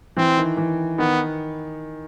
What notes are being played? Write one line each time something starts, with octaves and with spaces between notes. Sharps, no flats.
E3 C4
D#3
E3
D#3 B3